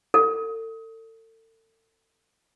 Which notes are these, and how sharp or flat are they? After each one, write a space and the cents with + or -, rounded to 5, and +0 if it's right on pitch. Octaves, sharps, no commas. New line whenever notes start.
A4 +35